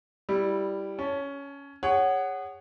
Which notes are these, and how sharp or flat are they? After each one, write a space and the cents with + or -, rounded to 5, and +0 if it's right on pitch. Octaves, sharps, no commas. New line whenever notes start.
G3 +0 E4 +0
C#4 +10 A5 -15
G#4 -30 C#5 +0 F#5 +10